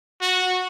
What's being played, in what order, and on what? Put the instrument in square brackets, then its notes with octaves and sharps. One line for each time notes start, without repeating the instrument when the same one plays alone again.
[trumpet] F#4